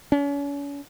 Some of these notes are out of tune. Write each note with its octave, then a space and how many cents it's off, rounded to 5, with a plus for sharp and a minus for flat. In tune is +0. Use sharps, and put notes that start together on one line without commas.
C#4 +40